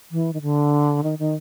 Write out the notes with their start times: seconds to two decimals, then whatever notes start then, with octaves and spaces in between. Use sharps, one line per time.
0.11 E3
0.33 D#3
0.42 D3
1.03 D#3
1.19 D#3